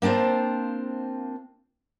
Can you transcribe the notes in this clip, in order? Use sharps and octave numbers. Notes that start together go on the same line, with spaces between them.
A#3 C4 D4 F4 C5